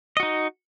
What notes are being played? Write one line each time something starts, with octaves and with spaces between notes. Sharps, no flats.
D#4 F#4 D#5